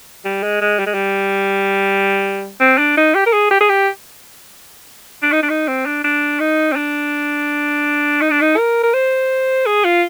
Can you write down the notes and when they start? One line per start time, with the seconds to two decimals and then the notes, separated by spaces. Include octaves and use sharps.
0.25 G3
0.43 G#3
0.61 G#3
0.79 G3
0.87 G#3
0.94 G3
2.60 C4
2.78 D4
2.97 D#4
3.15 G4
3.26 A#4
3.33 G#4
3.51 G4
3.61 G#4
3.69 G4
5.22 D4
5.32 D#4
5.43 D4
5.50 D#4
5.68 C4
5.86 D4
6.04 D4
6.40 D#4
6.72 C4
6.76 D4
8.21 D#4
8.31 D4
8.41 D#4
8.57 A#4
8.83 A#4
8.94 C5
9.66 G#4
9.84 F4